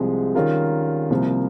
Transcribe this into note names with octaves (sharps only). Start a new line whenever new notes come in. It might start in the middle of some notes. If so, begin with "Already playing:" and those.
Already playing: C2 C3 F3 G#3
D#3 G3 C#4 F4 A#4
C2 C3 F3 A#3